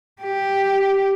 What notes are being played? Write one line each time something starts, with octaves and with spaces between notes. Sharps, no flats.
G4